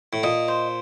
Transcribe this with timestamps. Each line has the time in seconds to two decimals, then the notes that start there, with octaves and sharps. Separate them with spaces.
0.13 A2
0.23 A#2 D#5
0.48 C5